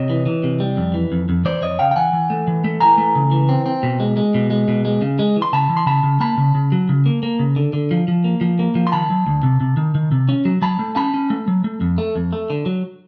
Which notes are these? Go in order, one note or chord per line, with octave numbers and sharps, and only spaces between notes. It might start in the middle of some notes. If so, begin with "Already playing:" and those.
Already playing: C3 C#5 D#5
E3
E3
C3
G3
F2
E3
F2
F2
E3 C5 D5
F2 C#5 D#5
C#3 F5 G5
G5
E3 F#5 G#5
E3
A3
E3
A3
E3 G#5 A#5
A3
C#3
E3
C4
C4
B2
G#3
G#3
B2
G#3
B2
G#3
C#3
G#3
E3
C6
C#3 A5 B5
E3
C6
C#3 A5 B5
C#3
A#3 A5 B5
C#3
C#3
F#3
C#3
A#3
A#3
C#3
D3
D3
F3
F3
A#3
F3
A#3
F3
C6
D#3 A5 B5
F#3
D2
C3
C3
D#3
D#3
C3
C#4
F#3
F#3 A5 B5
A3
C#4 A5 B5
C#4
A3
F#3
A3
F2
A3
F2
A3
D3
F#3